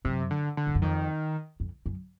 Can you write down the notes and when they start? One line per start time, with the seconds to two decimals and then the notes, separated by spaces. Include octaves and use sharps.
0.05 F#2 C3
0.31 D3
0.57 D3
0.67 G2
0.75 F#2
0.82 F2 D#3
1.60 F2
1.86 F#2